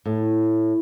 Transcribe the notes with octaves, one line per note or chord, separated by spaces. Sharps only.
A2